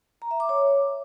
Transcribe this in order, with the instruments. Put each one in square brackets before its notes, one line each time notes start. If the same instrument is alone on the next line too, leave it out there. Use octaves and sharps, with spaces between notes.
[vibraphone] A#5
E5
D6
C#5